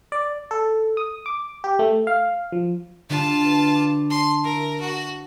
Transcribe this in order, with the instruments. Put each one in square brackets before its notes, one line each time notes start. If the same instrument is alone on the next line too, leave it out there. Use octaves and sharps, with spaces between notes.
[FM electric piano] D5
A4
D#6
D6
G4
A3
F5
F3
[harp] D3 G3 D4 [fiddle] F4 A5
[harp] B4
D6
[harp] A5 [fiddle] C6
[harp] E4 [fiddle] A#4
[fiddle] F#4